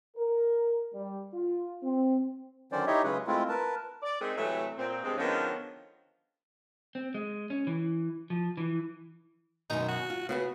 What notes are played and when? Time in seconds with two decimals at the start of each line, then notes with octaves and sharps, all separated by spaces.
0.16 A#4
0.94 G3
1.34 F4
1.83 C4
2.72 D3 D#3 F#3 C#4 C5 D5
2.87 D#4 E4 G4 C#5 D#5 E5
3.04 C#3 F#3 G#3 C#4 G#4 B4
3.27 G#3 A3 C4 E4 F4
3.49 A#4 B4 A5
4.02 D5
4.21 G#3 A3 C4 D#4 G#4 A#4
4.37 C3 E3 F#3 A3
4.78 A#2 C4
5.04 G2 C3 G#3 C4
5.18 D3 D#3 F3 G#3 B3 C#4
6.95 C4
7.14 G#3
7.50 C#4
7.67 E3
8.30 F3
8.57 E3
9.70 F#2 B2 D#3 D#4
9.88 F#4
10.10 F4
10.29 C#3 B3 F#4 B4